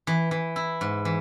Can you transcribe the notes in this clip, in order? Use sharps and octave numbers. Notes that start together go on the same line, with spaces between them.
E3
E3
E4
G#2
E3